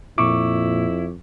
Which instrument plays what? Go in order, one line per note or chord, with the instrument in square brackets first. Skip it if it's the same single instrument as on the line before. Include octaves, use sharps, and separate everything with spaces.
[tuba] F2 [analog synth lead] A#2 [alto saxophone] E4 [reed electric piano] C#6 D6